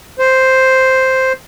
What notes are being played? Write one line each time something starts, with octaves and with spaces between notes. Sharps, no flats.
C5